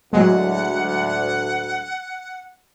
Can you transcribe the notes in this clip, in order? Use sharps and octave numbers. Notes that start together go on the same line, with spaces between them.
D2 A2 F#3 G#3 F#5